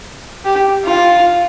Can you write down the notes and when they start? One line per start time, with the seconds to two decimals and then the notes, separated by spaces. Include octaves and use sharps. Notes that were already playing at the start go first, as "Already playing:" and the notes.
0.45 G4
0.85 F4